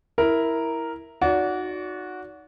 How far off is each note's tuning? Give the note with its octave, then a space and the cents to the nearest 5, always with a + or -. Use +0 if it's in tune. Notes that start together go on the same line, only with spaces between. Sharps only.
E4 -5 A#4 +0
D#4 +0 F#4 -10 D5 -35